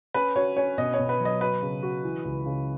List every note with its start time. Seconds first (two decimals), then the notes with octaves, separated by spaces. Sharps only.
0.14 C#4 B4
0.36 F#4 C#5
0.57 C#4 C#5
0.78 B2 D#5
0.94 C#5
0.99 B2
1.09 B4
1.20 F#3
1.25 D#5
1.41 F#4 B4
1.62 C#3
1.83 F#4
2.04 E3
2.24 C#2
2.46 C#3